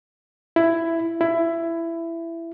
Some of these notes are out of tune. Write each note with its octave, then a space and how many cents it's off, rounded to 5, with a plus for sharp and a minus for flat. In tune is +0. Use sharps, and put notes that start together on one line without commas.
E4 +10
E4 +15